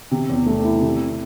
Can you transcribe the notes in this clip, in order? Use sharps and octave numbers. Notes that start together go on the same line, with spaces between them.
C3
E2
A3
E4
C3